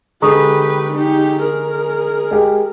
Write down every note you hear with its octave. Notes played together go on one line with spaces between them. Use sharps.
D3 G#3 G4 B4 A#5 C#6 D#6
D#4 G4
G#4 A#4
G#3 G4